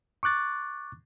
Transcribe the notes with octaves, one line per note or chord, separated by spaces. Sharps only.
C#6 D6 F#6 A6